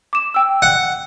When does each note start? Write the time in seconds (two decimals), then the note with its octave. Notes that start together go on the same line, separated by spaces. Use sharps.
0.13 D6 E7
0.34 G5 E6
0.62 F#5 C#7